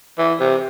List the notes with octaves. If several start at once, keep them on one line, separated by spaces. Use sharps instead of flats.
E3
C3